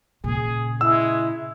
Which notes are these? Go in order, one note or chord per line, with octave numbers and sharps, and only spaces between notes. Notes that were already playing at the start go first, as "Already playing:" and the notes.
A#2 C#3 G#4
G#3 E4 E6